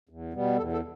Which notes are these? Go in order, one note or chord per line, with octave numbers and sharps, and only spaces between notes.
E2
B2 G3 B3
E2 A4
A4